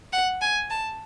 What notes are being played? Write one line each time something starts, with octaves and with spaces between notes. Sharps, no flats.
F#5
G#5
A5